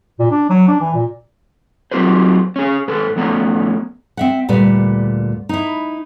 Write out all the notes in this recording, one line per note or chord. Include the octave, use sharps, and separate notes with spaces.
A#2
D4
F#3
D4
E3
A#2
F#3 C4 F4 G4 B4 C5
C#4 G#4
G#2 A4 B4
F2 A3 B3 C#4 G#5 A#5
C4 E5 F#5
D2 A#2 G3 B4
D#4 E4